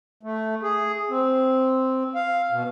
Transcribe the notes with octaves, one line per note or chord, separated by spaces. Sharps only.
A3
G#4
C4
F5
B2